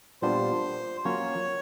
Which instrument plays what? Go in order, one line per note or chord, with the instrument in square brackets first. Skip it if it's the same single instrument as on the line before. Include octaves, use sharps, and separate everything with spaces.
[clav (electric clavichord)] A#2 G3 B3 D4 F4 [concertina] C5
[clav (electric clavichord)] F#3 A#3 C#4 F4 [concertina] C#5